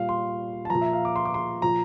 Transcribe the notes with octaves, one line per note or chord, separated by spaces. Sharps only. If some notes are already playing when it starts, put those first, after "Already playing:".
Already playing: A#2 G3 F5
C6
A5
A#2 F3 A#5
E5
F5
D6
C6
D6
C6
A#2 F3 A#5